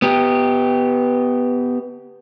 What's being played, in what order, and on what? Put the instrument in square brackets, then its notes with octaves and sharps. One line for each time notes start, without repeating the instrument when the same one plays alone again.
[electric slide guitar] B3 G4